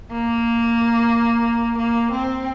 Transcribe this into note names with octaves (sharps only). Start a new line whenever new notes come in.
A#3
A#3
C4